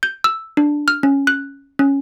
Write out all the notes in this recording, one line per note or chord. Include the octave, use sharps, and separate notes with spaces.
G6
E6
D4
F6
C#4
F#6
C#4